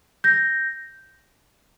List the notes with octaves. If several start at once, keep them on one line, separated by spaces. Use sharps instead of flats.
G6 A#6